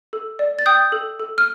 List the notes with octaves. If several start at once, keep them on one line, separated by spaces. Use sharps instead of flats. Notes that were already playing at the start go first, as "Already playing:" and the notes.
A4
D5
A6
G5 D#6 G6
A4
A4
F6